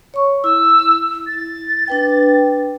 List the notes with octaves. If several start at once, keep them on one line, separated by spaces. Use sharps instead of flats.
C#5 C#6
E4 E6
A6
D4 B4 G5